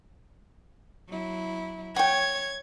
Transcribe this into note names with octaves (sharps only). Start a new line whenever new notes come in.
F#3 E4
C#5 F#5 G5 G#6